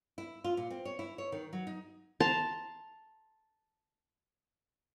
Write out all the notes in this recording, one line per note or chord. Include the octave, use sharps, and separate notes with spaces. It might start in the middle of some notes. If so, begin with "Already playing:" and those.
E4
F4
A#2
C4
C#5
E4
C#5
D#3
F#3
D#4
A5 A#5 C6